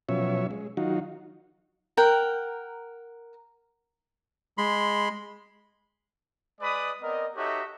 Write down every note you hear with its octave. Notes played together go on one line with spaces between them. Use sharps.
B2 F3 F#3 C#4 C#5 E5
G#3
D#3 F#3 D#4 F4 F#4
A#4 F#5 G5
G#3 B5 C6
G#3 B4 D5 D#5 B5 D#6
B3 C4 A#4 D5 D#5
D#4 F#4 G4 A4 C#5 E5